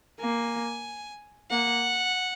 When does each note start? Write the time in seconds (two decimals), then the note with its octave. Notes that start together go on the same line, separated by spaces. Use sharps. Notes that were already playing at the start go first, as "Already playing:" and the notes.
0.20 A#3 G#5
1.51 A#3 F#5